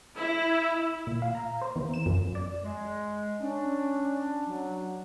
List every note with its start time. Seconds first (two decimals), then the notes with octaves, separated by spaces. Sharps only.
0.16 E4
1.07 A#2
1.22 F5
1.35 A#5
1.62 C5
1.76 E2
1.94 E7
2.06 F#2
2.35 D5
2.63 G#3
3.40 C#4 D4
4.46 F#3